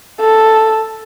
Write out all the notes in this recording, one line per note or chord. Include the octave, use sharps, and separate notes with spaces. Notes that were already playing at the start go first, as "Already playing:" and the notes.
A4